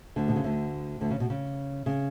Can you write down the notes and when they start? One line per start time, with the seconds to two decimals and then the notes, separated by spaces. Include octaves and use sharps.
0.16 D2 D3
0.28 B2
0.36 C#3
0.44 D2 D3
1.01 D2 D3
1.11 C#3
1.20 B2
1.30 C#3
1.86 C#3